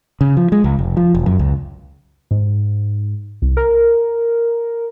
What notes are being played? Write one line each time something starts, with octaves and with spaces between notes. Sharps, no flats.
C#3
F3
G#3
C#2
F1
F3
E1
F#2
C#2
G#2
C2
A#4